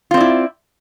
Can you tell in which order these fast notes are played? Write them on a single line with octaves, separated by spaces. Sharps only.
F4 C4 D5 E4